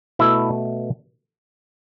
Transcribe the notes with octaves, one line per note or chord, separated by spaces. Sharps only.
B2 A3 E4